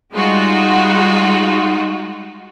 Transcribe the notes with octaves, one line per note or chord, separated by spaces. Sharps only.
G3 G#3 D#4 F4 F#4